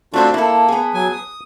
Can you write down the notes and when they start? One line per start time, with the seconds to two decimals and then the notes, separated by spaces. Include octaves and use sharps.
0.14 A3 C4 D4 F4 F#4 C5
0.34 A#3 E4 A4
0.68 B3 G#4
0.94 F#3 G#5
1.12 D#6